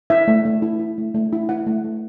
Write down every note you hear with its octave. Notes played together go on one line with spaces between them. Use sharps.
E4 E5
A3
A3
E4
E4
A3
A3
E4
E4 F#5
A3
A3